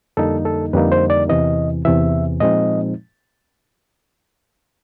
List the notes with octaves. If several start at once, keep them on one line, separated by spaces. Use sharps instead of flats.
F2 D3 G3 A#3 D#4 A4
A4
F2 D3 G3 A#3 D#4 B4
C5
D5
E2 C3 E3 D#5
E2 C3 E3 E5
A#2 F3 G#3 C4 D#4 D#5